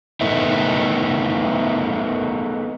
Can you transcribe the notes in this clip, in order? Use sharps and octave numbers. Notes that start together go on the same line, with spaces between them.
A3 B3 D#4 E4